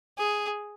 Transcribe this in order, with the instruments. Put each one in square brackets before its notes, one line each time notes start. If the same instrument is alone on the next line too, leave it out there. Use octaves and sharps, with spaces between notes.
[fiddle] G#4